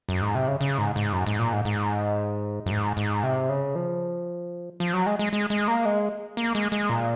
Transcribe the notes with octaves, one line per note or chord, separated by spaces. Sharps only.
F#2
G#2
C3
C#3
C#3
G#2
G#2
F#2
G#2
A#2
G#2
G#2
F#2
G#2
G#2
C3
C#3
F3
F3
F#3
G#3
G#3
G#3
G#3
A#3
G#3
A#3
G#3
G#3
A#2